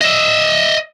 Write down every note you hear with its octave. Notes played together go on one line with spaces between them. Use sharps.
D#5 E5